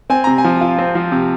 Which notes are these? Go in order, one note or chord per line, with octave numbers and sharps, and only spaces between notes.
C4 G#5
C3 A#5
G#5
F3
F4
C4
F3
C3